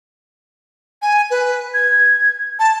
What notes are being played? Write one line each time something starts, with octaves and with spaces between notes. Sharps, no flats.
G#5
B4
G#6
A5